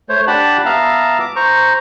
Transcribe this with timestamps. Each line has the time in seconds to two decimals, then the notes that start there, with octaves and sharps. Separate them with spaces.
0.09 A3 C5 C#5
0.27 D4 G4 D5 F#5 A5 B5
0.65 B3 E5 F5 A5 A#5
1.20 D6
1.36 C5 A#5 C#6